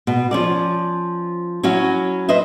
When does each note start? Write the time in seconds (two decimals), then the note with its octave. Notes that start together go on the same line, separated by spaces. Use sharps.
0.07 B2
0.31 F3 C#4 D5
1.63 F#3 C#4 E4 F#4
2.29 B4 C5 D#5 E5